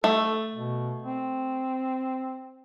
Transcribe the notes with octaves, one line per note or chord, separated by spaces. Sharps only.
A3 A4
B2
C4